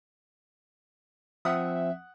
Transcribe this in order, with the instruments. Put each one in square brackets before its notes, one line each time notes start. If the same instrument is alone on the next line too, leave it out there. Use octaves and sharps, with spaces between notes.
[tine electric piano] F3 C4 [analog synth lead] E5 [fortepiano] F#5 D#6